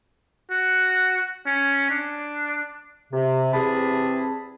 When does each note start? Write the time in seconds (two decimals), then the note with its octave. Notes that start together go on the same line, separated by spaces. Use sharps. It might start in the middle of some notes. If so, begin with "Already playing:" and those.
0.51 F#4
1.47 C#4
1.90 D4
3.13 C3
3.53 E2 C3 C4 G#4 A5 B5